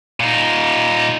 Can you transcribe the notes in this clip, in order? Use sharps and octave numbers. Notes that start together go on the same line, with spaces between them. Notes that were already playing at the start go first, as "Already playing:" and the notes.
A#2 D#4